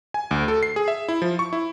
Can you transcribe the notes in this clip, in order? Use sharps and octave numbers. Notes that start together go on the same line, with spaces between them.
G#5
D2
A4
C7
G#4
E5
E4
F3
C#6
E4